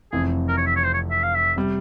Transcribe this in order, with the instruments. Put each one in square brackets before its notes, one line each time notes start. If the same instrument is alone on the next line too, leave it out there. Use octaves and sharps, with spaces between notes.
[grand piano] F1 F2 E3 [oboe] G#4
[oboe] A#4
C#5
E5
C#5
C5
C#5
E5
F5
E5
[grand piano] C3 G3